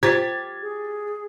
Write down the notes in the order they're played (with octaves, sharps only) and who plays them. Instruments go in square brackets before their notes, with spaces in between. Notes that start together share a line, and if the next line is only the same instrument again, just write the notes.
[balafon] F4 C5 A#5 [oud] G4 [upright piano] G#6 A6 B6
[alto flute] G#4